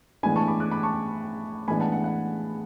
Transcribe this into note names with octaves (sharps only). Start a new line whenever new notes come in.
A2 E3 G#3 B3 D4 G#5 B5
A5 C#6
B5 D6
D6 F#6
B5 D6
A5 C#6
A2 E3 G#3 B3 D4 G#5 B5
F#5 A5
F#5
F#5